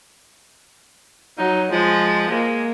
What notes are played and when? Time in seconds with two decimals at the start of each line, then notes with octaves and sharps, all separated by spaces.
1.38 F#3 D#4
1.72 F3 G#3
2.31 G#3 A#3